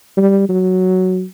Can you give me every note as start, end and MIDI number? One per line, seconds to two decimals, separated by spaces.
0.17 0.45 55
0.49 1.24 54